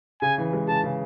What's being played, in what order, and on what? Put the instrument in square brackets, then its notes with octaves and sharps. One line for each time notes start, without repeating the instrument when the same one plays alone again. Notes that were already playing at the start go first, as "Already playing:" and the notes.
[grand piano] C#3 [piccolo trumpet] G#5
[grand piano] E3
G#3
[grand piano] C#3 [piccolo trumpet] A5
[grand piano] C#3